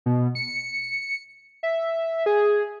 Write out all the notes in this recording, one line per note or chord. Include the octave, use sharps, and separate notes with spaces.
B2
C#7
E5
G#4